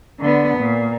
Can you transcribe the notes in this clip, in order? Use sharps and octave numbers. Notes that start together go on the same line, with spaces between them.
D3 B3
A#2